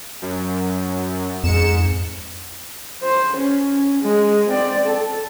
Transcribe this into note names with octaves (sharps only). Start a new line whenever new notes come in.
F#2
F2 G#2 C#7 E7
C5
C#4
G#3
C4 D5
A4